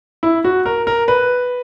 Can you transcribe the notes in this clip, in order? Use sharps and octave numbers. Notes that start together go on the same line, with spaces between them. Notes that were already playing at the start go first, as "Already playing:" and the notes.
E4
F#4
A#4
A#4
B4